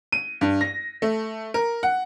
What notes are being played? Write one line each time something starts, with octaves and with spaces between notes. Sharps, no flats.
D#7
G2
A#6
A3
A#4
F#5